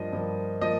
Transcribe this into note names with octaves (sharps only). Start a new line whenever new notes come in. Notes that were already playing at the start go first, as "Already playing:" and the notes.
Already playing: G2 F3 A#3 D#5
G2 F3 A#3
F3 A#3 D#5